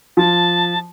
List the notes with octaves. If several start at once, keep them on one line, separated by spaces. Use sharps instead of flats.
F3 A5